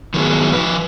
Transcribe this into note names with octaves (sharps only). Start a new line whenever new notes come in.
D#3 F3 F#3 B3 G#4
F3 B4